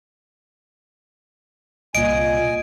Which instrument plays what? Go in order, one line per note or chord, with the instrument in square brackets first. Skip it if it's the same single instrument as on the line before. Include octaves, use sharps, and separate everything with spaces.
[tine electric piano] C2 A#2 [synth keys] D#5 [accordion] G#5 [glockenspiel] D7